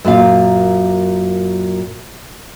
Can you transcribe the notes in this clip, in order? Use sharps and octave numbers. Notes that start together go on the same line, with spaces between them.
F#2 A#2 F5